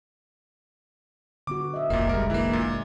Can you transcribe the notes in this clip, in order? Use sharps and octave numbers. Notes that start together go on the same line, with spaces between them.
D3 B3 F#4 D6
D#5 E5
F1 A#1 A#2 A#3
D3 G3 G#3 A#4
E3 A#3
A#2